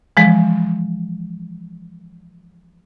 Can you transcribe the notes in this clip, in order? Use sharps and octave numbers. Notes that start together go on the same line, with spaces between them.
E3 F3 G#3